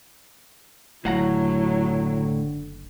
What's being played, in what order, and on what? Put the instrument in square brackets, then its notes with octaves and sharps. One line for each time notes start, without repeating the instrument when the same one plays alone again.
[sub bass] F#1 [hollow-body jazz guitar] A2 F#5 A#5 [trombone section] D3 [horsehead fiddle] F#3 E4